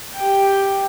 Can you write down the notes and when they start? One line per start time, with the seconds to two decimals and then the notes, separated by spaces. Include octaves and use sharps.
0.15 G4 G5